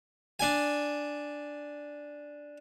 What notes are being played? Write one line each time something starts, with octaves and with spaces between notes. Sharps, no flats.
D4 G#5